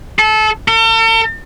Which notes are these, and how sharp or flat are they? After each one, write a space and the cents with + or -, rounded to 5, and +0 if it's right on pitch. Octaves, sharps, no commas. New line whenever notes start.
A4 -25
A4 +45